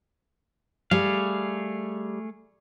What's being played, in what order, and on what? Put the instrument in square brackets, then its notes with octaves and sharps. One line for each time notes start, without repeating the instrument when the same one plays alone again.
[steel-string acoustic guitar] G3 [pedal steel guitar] A3 G#4 F5